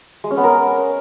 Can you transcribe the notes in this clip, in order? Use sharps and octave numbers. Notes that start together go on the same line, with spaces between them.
G#3
C#4
B3
A#4